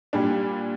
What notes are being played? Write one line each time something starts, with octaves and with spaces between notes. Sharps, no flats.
A#2 G3 D4